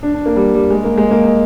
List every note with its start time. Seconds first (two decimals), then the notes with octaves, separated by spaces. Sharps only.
0.03 D4
0.14 D4
0.26 A#3
0.36 G3
0.54 G3
0.70 G#3
0.84 A#3
0.97 G#3
1.11 A#3
1.24 G#3